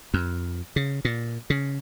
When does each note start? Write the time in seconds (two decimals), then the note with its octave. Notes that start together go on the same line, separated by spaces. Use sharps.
0.14 F2
0.76 C#3
1.05 A#2
1.50 C#3